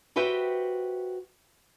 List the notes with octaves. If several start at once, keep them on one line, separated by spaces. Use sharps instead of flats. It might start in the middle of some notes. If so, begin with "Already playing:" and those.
F#4 G4 B4 C5 E5 G5